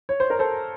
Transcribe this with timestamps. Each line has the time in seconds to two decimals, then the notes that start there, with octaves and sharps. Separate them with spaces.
0.09 C#5
0.20 C5
0.30 A#4
0.39 A4 C5